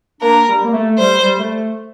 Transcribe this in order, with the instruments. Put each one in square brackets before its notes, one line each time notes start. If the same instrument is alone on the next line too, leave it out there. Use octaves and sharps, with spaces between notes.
[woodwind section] A#3 D4 [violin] A#4
[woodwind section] G3
A#3
A3
[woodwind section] G3 [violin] C5
[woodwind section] G3
A3